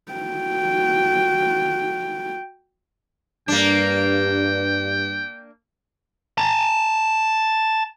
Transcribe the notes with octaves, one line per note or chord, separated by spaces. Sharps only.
F#4 G5
G2 A#3 D4 G5
A5 A#5